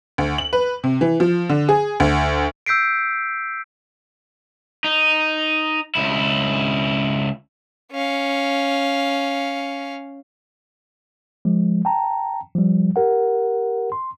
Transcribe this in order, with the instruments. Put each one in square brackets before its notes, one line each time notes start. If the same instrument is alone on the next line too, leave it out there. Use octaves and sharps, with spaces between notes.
[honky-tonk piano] D2
F#7
B4
C3
E3
F3
D3
G#4
D2
[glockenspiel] E6 G6 B6 C7 D7
[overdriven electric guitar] D#4
C#2 E4
[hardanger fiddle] C#4 F5
[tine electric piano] F3 G#3
G5 A5 A#5
F3 G3
G4 A#4 F#5
C6